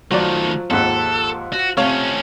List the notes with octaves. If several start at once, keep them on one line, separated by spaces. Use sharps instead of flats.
D#3 F3 F#3 A3 D5
D#2 G#2 F3 A4 F#5 E6
F#4
C3 A3 C#4 C#5 F5